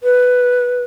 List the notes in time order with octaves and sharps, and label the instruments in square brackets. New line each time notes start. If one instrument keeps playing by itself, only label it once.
[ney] B4